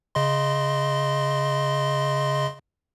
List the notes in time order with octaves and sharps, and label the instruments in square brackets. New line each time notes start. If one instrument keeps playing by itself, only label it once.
[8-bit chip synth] C#3 D#5 C6